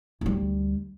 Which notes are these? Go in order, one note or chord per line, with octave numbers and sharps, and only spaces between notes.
D2 G3